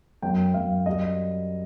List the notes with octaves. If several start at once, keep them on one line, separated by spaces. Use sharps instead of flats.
F#2 G5
F#2 F5
G3 D#5